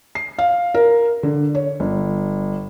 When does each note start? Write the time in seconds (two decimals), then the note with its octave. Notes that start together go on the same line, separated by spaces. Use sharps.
0.15 C7
0.39 F5
0.74 A#4
1.23 D3
1.55 C#5
1.80 G1